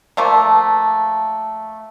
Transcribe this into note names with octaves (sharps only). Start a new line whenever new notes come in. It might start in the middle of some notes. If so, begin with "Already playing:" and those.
F3 A3 A#3